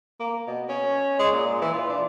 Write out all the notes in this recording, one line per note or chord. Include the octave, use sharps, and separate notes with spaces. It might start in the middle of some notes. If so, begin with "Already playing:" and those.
A#3
B2
C#4
G#3
A#2
E3
F4
D4